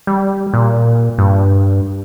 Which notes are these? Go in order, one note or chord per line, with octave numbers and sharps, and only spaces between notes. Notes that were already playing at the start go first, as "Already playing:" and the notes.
G3
A#2
G2